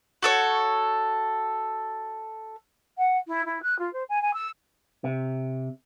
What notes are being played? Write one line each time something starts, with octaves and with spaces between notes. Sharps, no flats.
F#4 A4 C#5
F#5
E4
E4
F#6
F4
C5
G#5
G#5
E6
C3